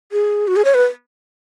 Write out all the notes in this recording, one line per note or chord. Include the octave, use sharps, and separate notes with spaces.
G#4
F#4
G#4
C#5
B4